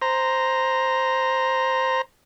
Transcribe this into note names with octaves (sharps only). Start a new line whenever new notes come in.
C5 A#5